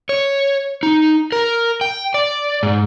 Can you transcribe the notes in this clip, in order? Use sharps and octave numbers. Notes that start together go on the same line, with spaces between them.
C#5
D#4
A#4
G5
D5
G#2